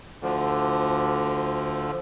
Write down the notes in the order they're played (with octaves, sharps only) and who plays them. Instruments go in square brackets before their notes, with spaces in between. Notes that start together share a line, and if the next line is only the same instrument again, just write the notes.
[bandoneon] D2 D3 F3